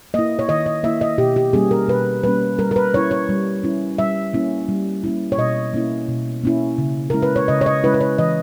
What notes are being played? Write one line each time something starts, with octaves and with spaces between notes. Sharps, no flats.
A#3 E4 D#5
C#5
D#3 D#5
D#5
A#3 E4 E5
D#5
B2 G4
G4
G3 A#3 C#4 G#4
A#4
B2 B4
G3 A#3 C#4 B4
G3 A#4
A#4
B4
C#4 E4 C#5
C#5
G3
C#4 E4
G3 E5
A#3 C#4 E4
G3
A#3 C#4 E4
C#5
B2 D#5
A#3 C#4 E4
B2
A#3 C#4 E4
C#3
G#3 C#4 E4 A#4
B4
C#5
C#3 D#5
C#5
D#5
G#3 C#4 E4 B4
B4
C#5
E3 D#5